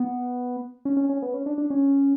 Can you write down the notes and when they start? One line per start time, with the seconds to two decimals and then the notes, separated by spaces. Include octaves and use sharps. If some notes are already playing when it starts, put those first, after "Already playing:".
Already playing: B3
0.85 C#4
0.97 C#4
1.09 C#4
1.22 B3
1.34 C#4
1.46 D4
1.58 D4
1.70 C#4